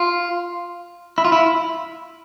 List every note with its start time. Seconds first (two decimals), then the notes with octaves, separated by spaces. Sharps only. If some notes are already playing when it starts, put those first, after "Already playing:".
Already playing: F4
1.18 E4
1.25 F4
1.32 E4